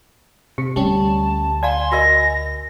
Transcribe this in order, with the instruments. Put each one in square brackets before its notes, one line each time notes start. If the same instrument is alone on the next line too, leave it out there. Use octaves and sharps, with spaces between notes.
[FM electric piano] C3 [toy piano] G4
[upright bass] D2 [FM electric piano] G3 C#4 [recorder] A5
[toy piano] D5 F5 A#5 [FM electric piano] G#5 [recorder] C6
[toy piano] F#4 A#4 D#5 [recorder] A#6